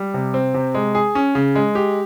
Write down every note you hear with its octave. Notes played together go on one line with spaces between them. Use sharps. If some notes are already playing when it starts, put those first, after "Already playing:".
Already playing: G3
C3
C4
C3
G#3
G#4
C#4
C#3
G#3
G4